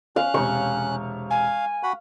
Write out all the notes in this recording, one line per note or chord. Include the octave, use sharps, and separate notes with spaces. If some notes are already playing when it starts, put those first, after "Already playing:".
C#4 F5 F#6
E1 C3 C#6
F5 G#5
F#4 F#5 B5